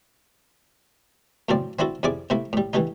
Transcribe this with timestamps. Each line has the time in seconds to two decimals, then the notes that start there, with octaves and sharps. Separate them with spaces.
1.49 F#2 A2 C#3 F3 C4 D5
1.79 C4 D4 E4 F#4 A4
2.03 F2 C3 E4 G#4 D5 D6
2.30 C3 A3 A#3 E4
2.53 A2 G3
2.73 D3 E3 G3 A3 D#4